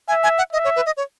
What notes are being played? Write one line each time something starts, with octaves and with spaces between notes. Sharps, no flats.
E5 G#5
G#5
F#5
D#5 E5
C#5
B4
D#5
C#5